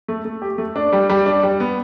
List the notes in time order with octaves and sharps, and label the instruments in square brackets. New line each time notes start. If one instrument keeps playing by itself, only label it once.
[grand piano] A3
A3
G4
A3
D4
G3
G3
D4
G3
B3